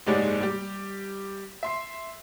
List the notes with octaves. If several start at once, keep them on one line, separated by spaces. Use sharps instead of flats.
F#1 G#2 G#3 G4 C#5 D5
G3 G4
E5 C6 C7